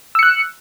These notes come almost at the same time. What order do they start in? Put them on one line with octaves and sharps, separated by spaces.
E6 C#7 F#6